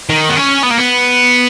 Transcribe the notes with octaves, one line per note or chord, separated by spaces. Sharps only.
D#3
B3
C#4
B3
A#3
B3